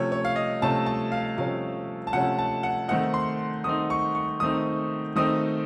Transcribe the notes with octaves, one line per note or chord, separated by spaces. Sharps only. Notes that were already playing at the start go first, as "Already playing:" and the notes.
Already playing: C3 F3 A3 C#4 C#5
C#5
F5
D#5
C3 F3 A3 C#4 A5
A5
F5
C3 F3 A3 C#4 F5
A5
C3 F3 A3 C#4 F#5
A5
F#5
D#3 A3 C4 D#4 F#5
C6
D#3 A3 C4 D#4 D#6
C#6
C#6
D#3 A3 C4 D#4 D#6
D#3 A3 C4 D#4 D#6